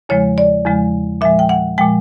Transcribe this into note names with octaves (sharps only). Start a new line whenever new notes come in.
E2 C#3 F3 G#3 C#5
D5
E2 C#3 F3 G#3
A#2 F3 G#3 E5
G5
F#5
A#2 F3 G#3 G5